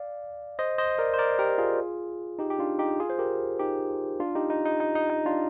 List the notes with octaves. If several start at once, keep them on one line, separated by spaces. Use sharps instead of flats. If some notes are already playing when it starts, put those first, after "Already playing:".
Already playing: D5 F5
C5 D#5
C5 D#5
A#4 D5
C5
A#4 D5
G4 A#4
F4 G#4
D#4 G4
G4
D4 F4
D#4 G4
F4 G#4
C5
G4 A#4
D#4 G4
D4 F4
D#4 G4
D#4
D#4
D#4
D#4
D#4
D4 F4